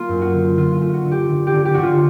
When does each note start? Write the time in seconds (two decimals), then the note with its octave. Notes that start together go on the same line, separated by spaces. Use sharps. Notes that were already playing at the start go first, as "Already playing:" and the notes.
Already playing: A#3 F4
0.09 F#2
0.21 F#4
0.33 D3
0.57 D3 F4
0.75 F4
0.81 A3
0.94 F#4
1.05 D3
1.11 G4
1.29 D3
1.47 G4
1.53 D3
1.65 G4
1.74 D3 F#4
1.83 F4